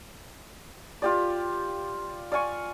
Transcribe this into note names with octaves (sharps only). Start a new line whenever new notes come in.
F4 G4 D5
D5 F5 G#5 C#6